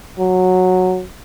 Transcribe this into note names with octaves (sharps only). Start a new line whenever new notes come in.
F#3